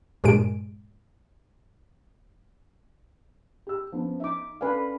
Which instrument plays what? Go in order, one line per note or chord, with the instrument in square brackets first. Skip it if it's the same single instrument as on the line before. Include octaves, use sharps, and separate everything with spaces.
[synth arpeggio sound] G2 A#2 G#3 D7
[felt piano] G4 E6
F3 B3 C#4
[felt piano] D#4 [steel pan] E5 D6
[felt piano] C#4 D5 G#5 [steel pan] A4 B4 F5